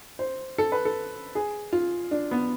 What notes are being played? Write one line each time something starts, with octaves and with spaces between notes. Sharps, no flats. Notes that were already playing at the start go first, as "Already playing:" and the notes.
C5
A4
B4
A4
G#4
F4
D4
B3